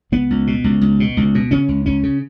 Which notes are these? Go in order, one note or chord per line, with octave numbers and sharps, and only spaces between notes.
C#2 B3
C#2
B2
C#2
C#2
B2
C#2
B2
C#3 C#4
C#2
C#2 C#4
C#3